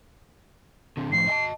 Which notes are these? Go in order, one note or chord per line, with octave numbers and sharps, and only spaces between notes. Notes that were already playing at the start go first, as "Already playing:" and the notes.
D3 C4
A2 F3 C7
D#5 G#5 A5